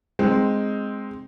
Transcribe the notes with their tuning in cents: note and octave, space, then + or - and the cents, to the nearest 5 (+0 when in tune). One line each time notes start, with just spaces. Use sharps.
G#3 +0 C4 +0 D#4 +0